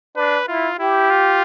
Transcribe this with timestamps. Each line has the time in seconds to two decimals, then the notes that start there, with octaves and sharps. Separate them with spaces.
0.17 D4 B4
0.48 E4 F4
0.79 E4 G4
1.10 F4